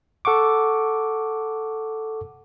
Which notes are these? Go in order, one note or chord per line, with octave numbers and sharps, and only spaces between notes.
A4 F#5 C#6 D6